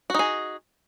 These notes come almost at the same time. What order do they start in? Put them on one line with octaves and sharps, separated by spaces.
F#4 D#4 G#4